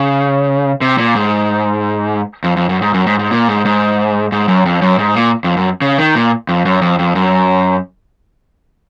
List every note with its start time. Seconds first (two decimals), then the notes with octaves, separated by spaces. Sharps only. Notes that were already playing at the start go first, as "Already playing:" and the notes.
Already playing: C#3
0.81 C3
0.98 A#2
1.15 G#2
2.44 F2
2.57 F2
2.69 F#2
2.82 G#2
2.94 F#2
3.07 G#2
3.19 G#2
3.31 A#2
3.48 G#2
3.65 G#2
4.32 G#2
4.48 F#2
4.66 F2
4.82 F#2
4.99 G#2
5.15 A#2
5.44 F2
5.57 F#2
5.82 C#3
5.99 D#3
6.15 A#2
6.49 F2
6.65 F#2
6.82 F2
6.99 F2
7.15 F#2